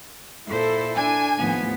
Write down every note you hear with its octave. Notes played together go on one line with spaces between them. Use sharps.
A#2 E4 A4 C5
D4 G#5
D#2 A2 F3 B3